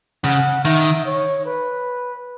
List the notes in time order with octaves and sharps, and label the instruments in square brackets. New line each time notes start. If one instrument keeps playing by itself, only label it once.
[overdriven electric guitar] C#3 [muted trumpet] F#5
[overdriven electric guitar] D#3 [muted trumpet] E5
[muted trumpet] C#5
B4